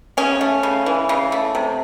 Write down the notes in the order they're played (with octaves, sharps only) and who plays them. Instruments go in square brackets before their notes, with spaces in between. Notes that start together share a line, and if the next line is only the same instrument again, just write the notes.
[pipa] C#3 C#4
A3
C#3
E3
C#3
A3
C3